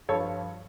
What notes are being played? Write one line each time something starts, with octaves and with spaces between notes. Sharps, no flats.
G2 F3 A4 C#5